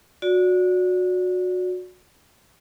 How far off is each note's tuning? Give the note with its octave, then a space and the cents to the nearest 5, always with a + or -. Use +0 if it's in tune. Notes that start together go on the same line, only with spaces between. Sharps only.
F#4 -20 D5 -15